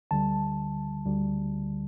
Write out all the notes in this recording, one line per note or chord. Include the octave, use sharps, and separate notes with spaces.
D2 D3 G3 A5
D2 D3 G3